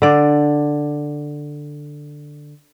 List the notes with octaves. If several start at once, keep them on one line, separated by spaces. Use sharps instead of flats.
D3 D5